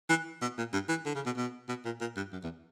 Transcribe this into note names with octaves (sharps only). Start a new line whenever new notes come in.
E3
B2
A#2
G2
E3
D3
C#3
B2
B2
B2
A#2
A#2
G2
F#2
E2